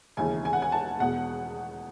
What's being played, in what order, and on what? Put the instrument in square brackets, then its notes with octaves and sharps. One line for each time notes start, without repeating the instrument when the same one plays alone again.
[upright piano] E1 D#2 C#3 E3 G#5
G#5
F#5
G#5
A5
E1 E2 B2 F#5